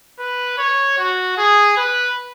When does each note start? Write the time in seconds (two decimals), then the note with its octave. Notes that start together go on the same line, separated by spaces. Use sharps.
0.19 B4
0.58 C#5
0.98 F#4
1.37 G#4
1.77 B4